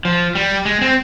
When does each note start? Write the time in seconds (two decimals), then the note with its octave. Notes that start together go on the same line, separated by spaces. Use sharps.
0.05 F3
0.35 G3
0.66 G#3
0.81 C4